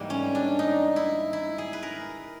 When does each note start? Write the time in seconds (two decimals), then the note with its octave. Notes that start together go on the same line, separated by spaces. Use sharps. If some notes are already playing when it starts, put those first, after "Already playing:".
Already playing: G#2 E3 G3 A#3
0.10 C#4
0.35 D4
0.59 D#4
0.96 E4
1.33 E4
1.58 G#4
1.73 B4
1.83 A#4